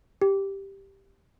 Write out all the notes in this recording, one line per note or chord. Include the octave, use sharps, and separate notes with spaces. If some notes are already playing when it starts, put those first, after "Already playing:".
G4